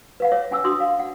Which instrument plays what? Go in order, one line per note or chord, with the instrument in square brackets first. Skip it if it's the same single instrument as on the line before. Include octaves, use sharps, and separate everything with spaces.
[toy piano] B4 F5 F#5
C#5 E5 D6
C#4 F#5 G#5 D6 E6
D4 F#4 E5 C6 D6 D#6
F5
F#5